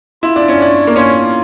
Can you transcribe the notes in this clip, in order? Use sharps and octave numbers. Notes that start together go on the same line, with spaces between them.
E4 F4
D4
C#4
D4 C#5
A#3
C#4 F4